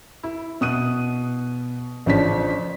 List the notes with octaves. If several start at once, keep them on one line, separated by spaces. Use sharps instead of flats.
E4
B2 D#6 F#6 D#7
A1 C#3 F3 D4 C#5 B6